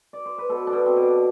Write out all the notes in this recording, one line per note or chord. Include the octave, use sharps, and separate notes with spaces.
D5
C5
B4
B2 A4
D4
B2
C4
B2
D4